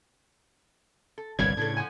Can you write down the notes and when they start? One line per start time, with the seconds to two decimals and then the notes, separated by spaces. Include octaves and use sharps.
1.18 A4
1.39 G1 C2 A#2 B4 C#5 D5 G#6
1.57 A2 C#3 D4 A4
1.77 F3 F#5 G#5